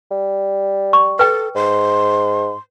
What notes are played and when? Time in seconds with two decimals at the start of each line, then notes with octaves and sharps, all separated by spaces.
0.11 G3
0.93 C#6
1.19 A4 B4 G5
1.55 G#2 C6